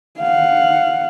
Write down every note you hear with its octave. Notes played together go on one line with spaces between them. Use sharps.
F5 F#5